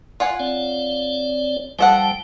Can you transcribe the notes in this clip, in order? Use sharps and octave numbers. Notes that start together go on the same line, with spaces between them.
F4 F#5 G#5
C4 C#5 D5
F3 G3 A4 F#5 G5